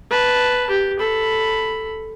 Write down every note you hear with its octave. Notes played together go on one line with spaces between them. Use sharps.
B4 A5
G4
A4 B5